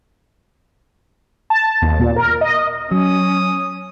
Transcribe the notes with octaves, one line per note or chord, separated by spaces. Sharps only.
A5
D#2
A#2
A#4
D#5
F#3 C#4 D#6